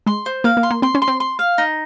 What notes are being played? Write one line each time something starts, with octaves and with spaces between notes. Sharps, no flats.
G#3 C6
C5
A#3 F5
A#3
C6
A#3
C4 C6
C#4
C6
C4
C6
F5
D#4